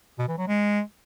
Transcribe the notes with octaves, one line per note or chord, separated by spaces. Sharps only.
B2
E3
F#3
G#3